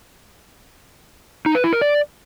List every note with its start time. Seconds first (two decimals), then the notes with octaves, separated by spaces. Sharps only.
1.46 D#4
1.55 B4
1.64 E4
1.73 A#4
1.81 D5